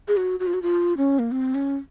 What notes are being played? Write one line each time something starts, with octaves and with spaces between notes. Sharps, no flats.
G#4
F#4
F#4
F4
F#4
F4
C#4
A#3
C4
C#4